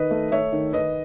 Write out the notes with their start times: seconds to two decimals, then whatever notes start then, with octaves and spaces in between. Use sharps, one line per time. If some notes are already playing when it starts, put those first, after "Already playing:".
Already playing: D#3 B4 D#5
0.11 A3
0.31 A3 C#5 E5
0.52 D#3
0.73 D#3 B4 D#5